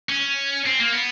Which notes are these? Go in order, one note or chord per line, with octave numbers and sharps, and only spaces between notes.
C#4
C4
A#3
B3